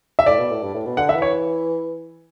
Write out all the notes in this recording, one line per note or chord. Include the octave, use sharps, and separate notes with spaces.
E5
A2 D5
B2
A2
G2
A2
B2
D3 F#5
E5
E3
C#5